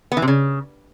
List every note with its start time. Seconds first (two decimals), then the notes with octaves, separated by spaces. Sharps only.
0.12 B3
0.17 E3
0.22 C3
0.28 C#3